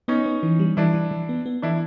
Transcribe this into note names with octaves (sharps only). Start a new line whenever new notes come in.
B3 C#4 D#4
B3
E3
G3
E3 D4 E4
E3
E3
B3
B3
E3 D4 E4